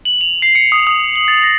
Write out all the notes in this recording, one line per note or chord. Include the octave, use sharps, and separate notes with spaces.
F#7
F7
C7
C#7
D#6
D#6
F#7
A6
A#6